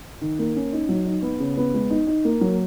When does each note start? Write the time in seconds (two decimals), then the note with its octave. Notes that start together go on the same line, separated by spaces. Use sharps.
0.21 D#3
0.39 A#3
0.56 C#4
0.73 D#4
0.89 F#3
1.06 D#4
1.22 B3
1.40 C#3
1.57 B3
1.74 G#3
1.90 D#4
2.07 D#4
2.25 A#3
2.41 F#3